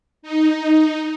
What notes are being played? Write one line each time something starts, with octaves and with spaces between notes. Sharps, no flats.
D#4